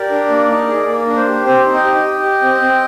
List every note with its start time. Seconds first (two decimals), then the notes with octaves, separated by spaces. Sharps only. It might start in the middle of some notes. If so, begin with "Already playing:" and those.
Already playing: G4 A#4 D5
0.10 D4
0.30 A#3
0.49 D#4
0.68 G#4
0.87 A#3 A#4
1.07 D4
1.16 C5
1.26 G4
1.45 C4 C5
1.65 D#4
1.74 D#5 G5
1.84 G4
2.03 G4
2.22 G4
2.41 C4
2.61 C4